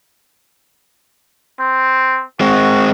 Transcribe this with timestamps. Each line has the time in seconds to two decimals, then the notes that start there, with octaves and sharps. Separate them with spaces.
1.60 C4
2.40 G#3 C4 F#4